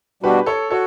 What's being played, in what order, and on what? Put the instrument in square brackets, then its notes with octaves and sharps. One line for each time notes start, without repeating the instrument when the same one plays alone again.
[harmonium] B2 G3 D4 F#4 [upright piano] G4 B4
[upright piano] A4 C#5
[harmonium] F#4 [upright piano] A4 C#5